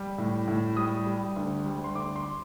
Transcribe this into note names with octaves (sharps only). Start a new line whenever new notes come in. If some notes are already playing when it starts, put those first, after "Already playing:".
Already playing: G3
A2
A2
G3 D#6
G3
D2
G3
C6
D2 D6
C6